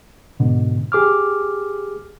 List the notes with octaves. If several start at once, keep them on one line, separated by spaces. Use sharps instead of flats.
G#2 B2 D3
G4 G#4 D6 F6